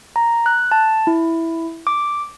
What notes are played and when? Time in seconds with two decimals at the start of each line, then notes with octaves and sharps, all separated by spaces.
0.16 A#5
0.46 F#6
0.71 A5
1.07 E4
1.87 D6